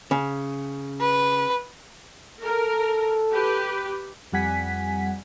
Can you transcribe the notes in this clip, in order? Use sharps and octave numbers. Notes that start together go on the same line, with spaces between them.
C#3
B4
A4 A#4
G4 B4
F2 G3 F#5 G#5 B6